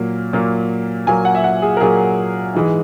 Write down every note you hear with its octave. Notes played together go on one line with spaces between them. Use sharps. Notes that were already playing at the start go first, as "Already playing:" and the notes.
Already playing: A#2 F#3 A#3
A#2 F#3 A#3
A#2 F#3 A#3 G#5
F#5
E5
F#5
G#4
A#4
A#2 F#3 A#3 G#4
G#2 E3 G#3